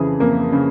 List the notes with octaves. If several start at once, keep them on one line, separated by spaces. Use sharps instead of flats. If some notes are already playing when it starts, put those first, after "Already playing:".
Already playing: F2 C#3 E3 G#4
F2 A#3
C#3